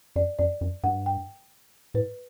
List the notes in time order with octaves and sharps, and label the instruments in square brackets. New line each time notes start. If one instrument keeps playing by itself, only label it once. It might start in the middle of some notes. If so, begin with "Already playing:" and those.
[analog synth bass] F#2 [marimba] D5
[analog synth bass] F#2 [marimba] D5
[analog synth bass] F#2
[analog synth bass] G2 [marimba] F#5
[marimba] G5
[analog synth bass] A2 [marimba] B4